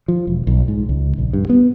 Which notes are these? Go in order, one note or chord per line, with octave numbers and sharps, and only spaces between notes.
F3
E1
B1
G#2
C#2
A#1
G2
B3